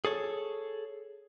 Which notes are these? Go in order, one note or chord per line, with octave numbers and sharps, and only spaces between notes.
G#4 A4 C#5